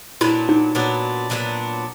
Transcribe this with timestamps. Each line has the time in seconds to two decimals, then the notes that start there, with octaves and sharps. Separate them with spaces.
0.21 A#2 F#3 B3 D4 E4
0.49 D#4
0.75 A#2 F#3 B3 D4
1.30 A#2 F#3 B3 D4